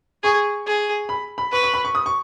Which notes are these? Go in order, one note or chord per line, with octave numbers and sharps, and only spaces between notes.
G#4 C#6
G#4
B5
B5
B4 C#6
C#6
B5
C#6
D#6
C#6